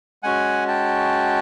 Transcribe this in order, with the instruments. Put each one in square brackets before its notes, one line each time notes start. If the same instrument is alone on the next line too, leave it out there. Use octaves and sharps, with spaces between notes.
[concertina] G#3 C#4 F#4 F#5 G#5
G5 A5